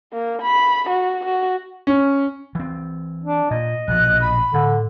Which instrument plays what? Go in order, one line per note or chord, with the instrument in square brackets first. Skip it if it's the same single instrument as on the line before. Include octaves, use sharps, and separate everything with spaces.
[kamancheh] A#3
B5
F#4
F#4
[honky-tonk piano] C#4
[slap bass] E3 C4
[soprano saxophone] D4
[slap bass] A#2 [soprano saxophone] D#5
[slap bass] A#1 B2 F3 [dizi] F#6
[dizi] B5
[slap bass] A2 [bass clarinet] D3